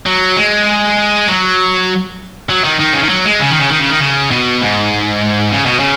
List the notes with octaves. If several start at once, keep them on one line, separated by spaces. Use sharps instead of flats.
F#3
G#3
F#3
F#3
D#3
D#3
C#3
D#3
F#3
G#3
C#3
D#3
C#3
D#3
C#3
D#3
C#3
B2
G#2
C#3
B2
C#3